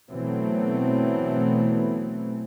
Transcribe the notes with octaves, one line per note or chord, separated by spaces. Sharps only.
B2 E3 F#3 A3 B3 C4